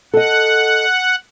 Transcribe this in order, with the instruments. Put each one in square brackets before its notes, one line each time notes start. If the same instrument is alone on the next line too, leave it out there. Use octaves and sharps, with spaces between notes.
[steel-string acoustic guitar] A4 D#5 [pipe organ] F#5